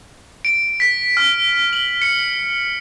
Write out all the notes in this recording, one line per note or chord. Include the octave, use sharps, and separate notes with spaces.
D7
B6
F6
F#7
C#7